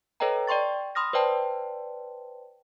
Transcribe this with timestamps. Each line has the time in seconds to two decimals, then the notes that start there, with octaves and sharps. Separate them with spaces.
0.20 A4 B4 C#5 D#5 G5 A#5
0.47 D5 G5 C6 C#6 A6
0.95 B5 C6 D#6 F6 A#6
1.13 B4 C5 D5 G5 A5 C6